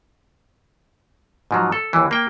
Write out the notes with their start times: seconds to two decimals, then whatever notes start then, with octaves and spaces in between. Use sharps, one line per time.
1.51 G#2 F3 F#3
1.72 A4
1.93 D#2 E3
2.11 A#3 G5